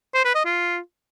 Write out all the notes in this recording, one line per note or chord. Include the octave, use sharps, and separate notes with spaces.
C5
B4
D#5
F4